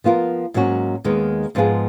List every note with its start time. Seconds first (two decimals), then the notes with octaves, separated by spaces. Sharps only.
0.04 F3 B3 F4 A#4
0.54 G#2 F#3 A#3 C#4 F#4
1.04 D#2 D#3 G#3 B3 D#4
1.55 G#2 F3 B3 F4 G#4